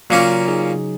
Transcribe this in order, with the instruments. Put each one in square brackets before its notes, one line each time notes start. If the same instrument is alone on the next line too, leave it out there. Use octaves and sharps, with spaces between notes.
[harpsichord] A#2 A#3 C#4 [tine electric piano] C#3 F#3
[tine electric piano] D#4 G#4